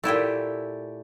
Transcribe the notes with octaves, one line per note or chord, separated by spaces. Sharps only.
A#2 A3 E4 G4